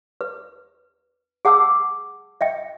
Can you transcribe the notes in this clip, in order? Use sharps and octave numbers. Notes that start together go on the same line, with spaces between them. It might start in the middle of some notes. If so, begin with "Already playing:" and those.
B4
G#4 F#5 A5 D6 E6
D#5 E5 G5